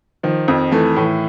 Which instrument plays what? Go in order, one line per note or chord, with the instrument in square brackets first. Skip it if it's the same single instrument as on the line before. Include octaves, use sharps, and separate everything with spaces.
[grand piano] D#3 [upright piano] F3
[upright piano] F2
[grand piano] E3 [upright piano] A3
[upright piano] A2 [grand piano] E3